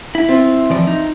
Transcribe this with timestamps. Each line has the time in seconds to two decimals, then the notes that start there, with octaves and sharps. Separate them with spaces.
0.15 E4
0.28 C4 F4 E5
0.70 E3 F3 D5
0.87 D#4